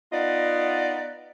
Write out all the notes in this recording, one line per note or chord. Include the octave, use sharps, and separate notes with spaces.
B3 D#4 F4 D5 D#5 F#5